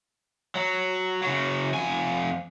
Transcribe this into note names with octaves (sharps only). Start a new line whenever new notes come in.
F#3
C#3 F#3
F2 G#5